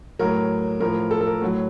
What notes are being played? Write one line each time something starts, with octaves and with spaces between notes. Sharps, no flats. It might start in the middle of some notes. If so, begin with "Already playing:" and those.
A2 F#3 A#4
A2 F3 A#4
A4
A4
A#4
A2 F#3